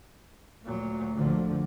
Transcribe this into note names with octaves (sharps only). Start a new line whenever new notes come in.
D2 A#2 F#3
A#1 D3 F3